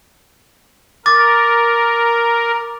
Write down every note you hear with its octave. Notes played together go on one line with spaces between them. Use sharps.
A#4 D6 A6